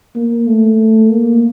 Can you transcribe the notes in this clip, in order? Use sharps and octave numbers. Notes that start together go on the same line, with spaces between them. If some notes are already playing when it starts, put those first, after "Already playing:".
A#3
A3
A#3